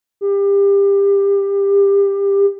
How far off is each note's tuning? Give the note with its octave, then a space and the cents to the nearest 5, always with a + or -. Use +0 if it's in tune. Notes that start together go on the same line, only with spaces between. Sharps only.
G4 +25